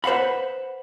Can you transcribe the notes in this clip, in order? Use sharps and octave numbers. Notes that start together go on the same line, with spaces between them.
B4 C5 F5 F#5 B5